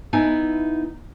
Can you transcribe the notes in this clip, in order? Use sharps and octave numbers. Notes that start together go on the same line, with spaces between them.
B3 D#4 E4 G#5